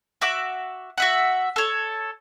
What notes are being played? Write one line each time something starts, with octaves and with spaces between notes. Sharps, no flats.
F#4 E5 D6
F#4 E5 F#5
A4 C#5